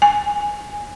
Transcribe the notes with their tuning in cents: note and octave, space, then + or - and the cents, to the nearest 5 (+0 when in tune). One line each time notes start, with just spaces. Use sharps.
G#5 -5